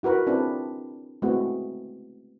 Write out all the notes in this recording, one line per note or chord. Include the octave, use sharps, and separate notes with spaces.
E4 F#4 A#4 B4
C4 D4 E4 F4 G#4 B4
G#3 A3 B3 C4 E4 F#4